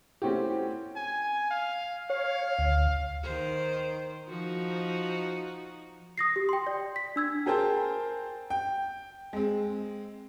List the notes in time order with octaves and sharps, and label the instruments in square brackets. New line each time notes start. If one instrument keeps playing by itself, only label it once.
[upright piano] A3 C4 C#4 E4 F#4 G4
[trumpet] G#5
F5
[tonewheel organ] C#5 [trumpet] F5
[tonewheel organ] D2
[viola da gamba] D#3 C5
F3 D#4 F#4
[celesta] D#6 A#6 C7
G4
G5 C6
D5
B6
D4 E6 G#6
[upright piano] G#4 A#4 C5 G5 A5
G5
G#3 C4